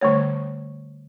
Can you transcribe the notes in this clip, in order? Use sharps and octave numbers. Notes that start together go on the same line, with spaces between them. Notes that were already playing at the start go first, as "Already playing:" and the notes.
D3 G3 A3 C#5